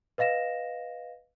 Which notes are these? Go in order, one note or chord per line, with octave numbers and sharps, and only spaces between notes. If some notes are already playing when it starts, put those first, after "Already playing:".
B4 D#5 F5 A#6 E7